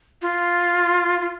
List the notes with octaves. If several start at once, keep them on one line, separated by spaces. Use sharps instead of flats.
F4
F4